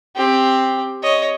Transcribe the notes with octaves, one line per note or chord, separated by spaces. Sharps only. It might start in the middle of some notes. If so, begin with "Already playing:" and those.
C4 G4
C#5 D#5